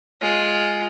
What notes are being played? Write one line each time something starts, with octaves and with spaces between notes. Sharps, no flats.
G#3 F4